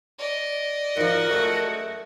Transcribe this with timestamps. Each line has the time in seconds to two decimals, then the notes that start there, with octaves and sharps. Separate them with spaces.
0.18 D5 D#5
0.97 G#2 F3 F#4 A#4
1.30 F#2 G#3 A3